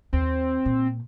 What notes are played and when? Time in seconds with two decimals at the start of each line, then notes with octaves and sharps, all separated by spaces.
0.13 D#2 C4
0.65 A#2